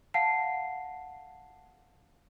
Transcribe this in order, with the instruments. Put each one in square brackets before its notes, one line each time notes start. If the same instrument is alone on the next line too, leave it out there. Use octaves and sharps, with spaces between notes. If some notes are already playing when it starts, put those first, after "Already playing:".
[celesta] F5 F#5 A5 C7